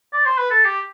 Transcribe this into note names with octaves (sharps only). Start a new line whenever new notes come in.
D5
C5
B4
A4
G4